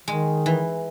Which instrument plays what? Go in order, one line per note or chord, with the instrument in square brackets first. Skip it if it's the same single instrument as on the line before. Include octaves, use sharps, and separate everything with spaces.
[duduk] D#3 [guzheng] G#3
[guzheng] E3